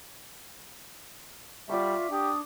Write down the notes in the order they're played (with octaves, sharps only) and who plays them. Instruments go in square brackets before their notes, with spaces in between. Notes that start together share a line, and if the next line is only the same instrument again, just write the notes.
[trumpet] G3 [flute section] F4 E5 [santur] D5 F#5 C#6
[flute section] D4 D#6 [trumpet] G4